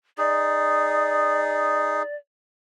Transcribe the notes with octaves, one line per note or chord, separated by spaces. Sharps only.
D#4 G#4 D5